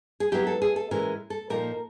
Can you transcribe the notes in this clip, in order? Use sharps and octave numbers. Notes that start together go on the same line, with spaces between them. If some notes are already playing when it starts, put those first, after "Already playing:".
G#4
F#3 B3 E4 G4
A4
G#4
A4
A2 E3 G#3 C#4 E4 A#4
A4
A#2 F3 A#3 D#4 A#4